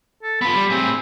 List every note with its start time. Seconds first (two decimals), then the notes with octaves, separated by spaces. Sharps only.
0.23 A4
0.41 B3 F4 B5
0.54 G3
0.70 A2 C4 G#4